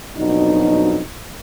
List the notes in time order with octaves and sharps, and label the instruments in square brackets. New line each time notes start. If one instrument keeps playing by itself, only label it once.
[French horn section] F2 B2 F#3 D4 D#4